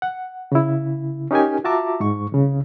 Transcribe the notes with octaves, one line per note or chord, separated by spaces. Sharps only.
F#5
C#3 E4
C#4 D#4 G4 A#4 G#5
F4 F#4 E5 A5 A#5 D6
G#2 C#6
C2 C#3